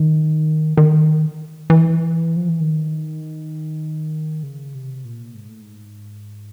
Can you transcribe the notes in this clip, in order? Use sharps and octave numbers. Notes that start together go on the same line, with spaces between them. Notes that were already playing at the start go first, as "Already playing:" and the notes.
Already playing: D#3
D#3
E3
F3
E3
D#3
C#3
C3
A#2
G#2
A2
G#2